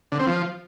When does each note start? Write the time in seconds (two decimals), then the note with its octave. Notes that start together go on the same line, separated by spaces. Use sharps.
0.12 D3
0.19 C4
0.27 F3